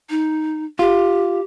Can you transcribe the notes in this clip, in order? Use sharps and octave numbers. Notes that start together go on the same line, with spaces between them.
D#4
F4 G4